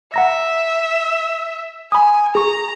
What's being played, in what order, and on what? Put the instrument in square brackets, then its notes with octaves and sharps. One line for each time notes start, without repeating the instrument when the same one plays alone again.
[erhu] E5 [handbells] F#5 A#5 A#6
[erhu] G#5 [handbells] B5 D#6
[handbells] G#4 C#6 [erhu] A#5